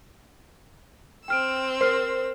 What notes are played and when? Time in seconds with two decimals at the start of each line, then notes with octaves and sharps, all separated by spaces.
1.28 C4 G5 E6 F6 D7
1.81 A#4 C5 F6 C7